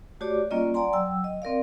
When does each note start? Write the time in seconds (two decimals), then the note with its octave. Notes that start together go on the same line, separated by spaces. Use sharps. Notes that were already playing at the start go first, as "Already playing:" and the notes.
0.21 A3 F#4 G4 C#5 D5 D6
0.51 G3 A#3 C#4 F4 D5 D#5
0.74 D5 F#5 G#5 A#5 C6
0.93 F#3 G5 E6
1.24 D#5
1.42 C4 A#4 D5 F5